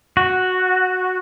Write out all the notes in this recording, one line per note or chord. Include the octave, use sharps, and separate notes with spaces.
F#4